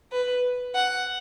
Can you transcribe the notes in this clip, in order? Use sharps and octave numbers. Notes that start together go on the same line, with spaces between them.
B4
F#5